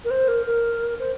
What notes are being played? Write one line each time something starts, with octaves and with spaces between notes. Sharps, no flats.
A#4
C5
A#4
A#4
C5